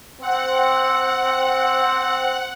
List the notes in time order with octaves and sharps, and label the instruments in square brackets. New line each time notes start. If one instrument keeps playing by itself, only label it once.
[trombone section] C4 [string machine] F#5